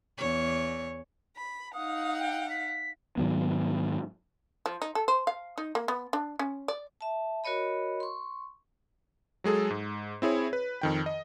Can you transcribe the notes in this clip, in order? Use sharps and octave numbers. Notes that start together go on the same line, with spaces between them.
E2 C#5
B5
D#4 F5 F#5 D#6
G5
B6
G#2 D#3 F#3 B3
F3
D#4
A4
C5
F5
D#4
A#3
B3
D4
C#4
D5
E5 A5
F#4 A#4 C#5 D#5 B5
C6 C#6
F#3 G#3 G#4 A4
G#2
C4 E4 G#4 C#5
B4
F2 D#3 G5
D#5